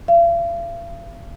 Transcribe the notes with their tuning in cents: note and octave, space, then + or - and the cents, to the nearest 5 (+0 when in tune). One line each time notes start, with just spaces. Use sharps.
F5 -45